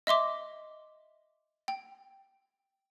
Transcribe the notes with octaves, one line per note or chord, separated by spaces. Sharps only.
D#5 E5 C6 D6
G5